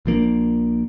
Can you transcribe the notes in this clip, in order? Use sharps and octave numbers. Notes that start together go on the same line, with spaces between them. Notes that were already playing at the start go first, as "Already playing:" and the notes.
A#1 F3 A#3 D4